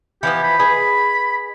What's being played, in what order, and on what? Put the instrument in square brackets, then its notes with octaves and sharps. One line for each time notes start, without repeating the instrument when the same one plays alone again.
[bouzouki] E3 F3 B3 [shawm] G4
[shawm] B5
[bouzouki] G#4 B4 D#5